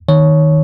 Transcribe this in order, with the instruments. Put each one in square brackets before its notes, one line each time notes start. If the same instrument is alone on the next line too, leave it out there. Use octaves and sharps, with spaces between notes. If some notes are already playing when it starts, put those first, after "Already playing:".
[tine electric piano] D#3 C#5